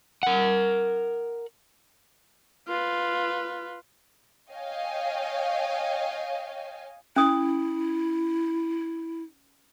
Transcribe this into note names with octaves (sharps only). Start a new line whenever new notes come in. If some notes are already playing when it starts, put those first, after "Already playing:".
A#4 F#5
F4 B4
C#5 D#5 F5 G5 G#5
C#4 E4 D#6